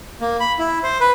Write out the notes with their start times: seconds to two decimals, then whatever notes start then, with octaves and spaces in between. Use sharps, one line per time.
0.21 A#3
0.40 B5
0.59 E4
0.83 C5
1.00 B4